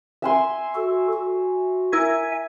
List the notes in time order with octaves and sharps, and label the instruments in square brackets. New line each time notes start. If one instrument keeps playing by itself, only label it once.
[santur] E5 G#5 C6
[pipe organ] F#4 A4
F#4
[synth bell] E4 A#4 G#6 [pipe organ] E5 G#5